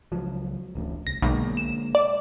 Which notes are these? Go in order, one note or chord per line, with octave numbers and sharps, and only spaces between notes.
C#2 F3 F#3
D1 A1 D2
C2 A#6
B1 D3 G#3 A#3
E7
D5